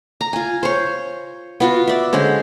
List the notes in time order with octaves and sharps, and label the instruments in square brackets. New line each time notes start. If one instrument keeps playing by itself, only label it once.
[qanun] A#5
F4 G#5
C5 C#5
B3 F4 F#4
D5 E5
D3 G#3 C#4 C5